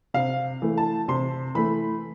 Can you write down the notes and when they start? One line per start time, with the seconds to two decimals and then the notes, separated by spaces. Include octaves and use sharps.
0.14 C3 F5
0.62 E3 A3
0.78 A5
1.08 C3 C6
1.55 E3 A3 B5